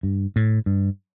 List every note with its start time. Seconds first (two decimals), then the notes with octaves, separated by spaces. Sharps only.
0.03 G2
0.36 A2
0.66 G2